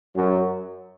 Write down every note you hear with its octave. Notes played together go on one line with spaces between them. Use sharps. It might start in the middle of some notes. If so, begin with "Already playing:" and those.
F#2 F#3